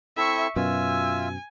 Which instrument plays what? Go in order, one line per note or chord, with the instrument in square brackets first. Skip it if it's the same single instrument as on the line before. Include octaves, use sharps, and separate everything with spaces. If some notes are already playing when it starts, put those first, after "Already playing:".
[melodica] C4 E4 A4 [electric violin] E5 C#6
[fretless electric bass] F#2 B2 [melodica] F4 E5 E6 [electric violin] G#5